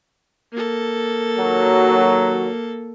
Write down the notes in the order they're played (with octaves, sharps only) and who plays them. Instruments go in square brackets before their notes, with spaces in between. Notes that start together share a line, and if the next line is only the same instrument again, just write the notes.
[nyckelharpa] A#3 A4
[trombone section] D#2 F#3